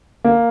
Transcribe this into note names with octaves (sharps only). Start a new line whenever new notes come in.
A#3